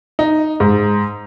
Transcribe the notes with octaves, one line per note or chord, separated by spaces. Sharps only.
D#4
G#2